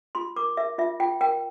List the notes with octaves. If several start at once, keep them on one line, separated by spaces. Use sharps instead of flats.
F4 C6
A#4 D6
A#4 E5
F4 E5
F4 G5
A#4 G5